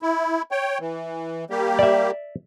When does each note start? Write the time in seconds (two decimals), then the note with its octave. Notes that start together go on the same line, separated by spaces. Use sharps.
0.02 E4
0.51 C#5 G5
0.80 E3
1.50 G3 A#3 G4
1.79 D5 E5